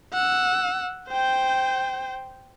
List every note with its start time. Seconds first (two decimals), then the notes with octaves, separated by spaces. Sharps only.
0.14 F#5 E6
1.09 C5 G5